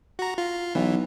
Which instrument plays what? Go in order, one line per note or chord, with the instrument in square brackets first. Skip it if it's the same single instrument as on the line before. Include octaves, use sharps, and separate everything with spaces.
[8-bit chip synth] F#4 A#5
F4
[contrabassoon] B1 [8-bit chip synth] E3